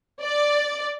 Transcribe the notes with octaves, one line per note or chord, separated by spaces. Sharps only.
D5